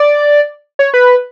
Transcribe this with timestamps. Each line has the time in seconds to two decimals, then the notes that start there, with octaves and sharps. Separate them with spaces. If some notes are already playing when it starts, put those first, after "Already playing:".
Already playing: D5
0.79 C#5
0.94 B4